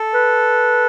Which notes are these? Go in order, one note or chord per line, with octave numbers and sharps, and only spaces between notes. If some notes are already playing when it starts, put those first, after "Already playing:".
Already playing: A4
B4